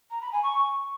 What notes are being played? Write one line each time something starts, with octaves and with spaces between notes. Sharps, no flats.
A#5
B5
G#5
C#6